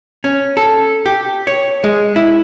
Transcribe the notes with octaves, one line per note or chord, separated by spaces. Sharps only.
C#4
A4
G4
C#5
G#3
E4